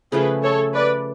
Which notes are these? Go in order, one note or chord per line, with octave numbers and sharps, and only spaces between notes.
C#3 F3 A3 G#4 B4
A4 C#5
B4 D5